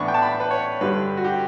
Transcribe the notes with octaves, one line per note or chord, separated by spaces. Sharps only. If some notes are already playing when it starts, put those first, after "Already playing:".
Already playing: A2 E3 B3 D4 C#6
G5
A5
B5
B4
C#5
G2 D3 G3 B4
F#4
G4